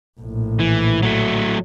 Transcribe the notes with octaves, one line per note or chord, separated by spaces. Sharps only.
A#1 A2
E3
F#3 A3